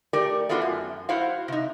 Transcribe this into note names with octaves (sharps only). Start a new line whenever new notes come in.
A3 G4 A#4 D5
A3 B3 D4 F4 F#4
F#2
E4 F#4 C5 F5 F#5
C3 D#4